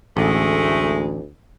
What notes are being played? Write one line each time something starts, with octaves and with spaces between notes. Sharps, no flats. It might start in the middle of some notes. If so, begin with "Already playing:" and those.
A1 D2 G#3 A3